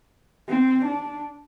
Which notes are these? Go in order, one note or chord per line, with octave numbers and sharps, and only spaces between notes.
C4
D4